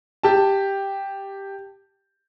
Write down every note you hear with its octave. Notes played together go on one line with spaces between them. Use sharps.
G4 A5